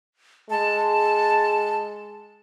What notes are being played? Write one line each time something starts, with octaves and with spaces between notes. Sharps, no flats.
G#3 A5